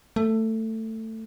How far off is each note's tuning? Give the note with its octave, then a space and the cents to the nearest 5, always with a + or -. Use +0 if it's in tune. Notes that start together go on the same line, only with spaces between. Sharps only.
A3 +15